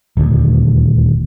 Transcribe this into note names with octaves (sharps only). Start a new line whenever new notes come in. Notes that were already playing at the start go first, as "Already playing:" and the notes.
D#1 D2